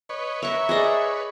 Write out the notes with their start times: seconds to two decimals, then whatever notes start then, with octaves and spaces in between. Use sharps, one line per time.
0.09 B4 C#5 D#5
0.42 A#4 E5 C#6
0.69 G#4 D5 D#5